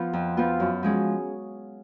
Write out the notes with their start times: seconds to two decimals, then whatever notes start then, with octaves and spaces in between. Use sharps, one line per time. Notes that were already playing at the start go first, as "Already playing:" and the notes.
Already playing: F3 B3 F4
0.13 F2
0.37 F3 B3 F4
0.60 F#2
0.83 F3 G#3 C#4 G#4